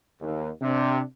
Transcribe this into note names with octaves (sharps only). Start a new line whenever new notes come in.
D#2
C3 D4